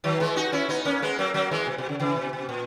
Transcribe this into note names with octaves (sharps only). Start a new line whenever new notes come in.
D#3 F#3
E3 G#3
D#4 F#4
C#4 E4
B3 D#4
A#3 C#4
G#3 B3
F#3 A#3
F#3 A#3
E3 G#3
B2
B2
C#3
C#3 E3
B2
B2
A#2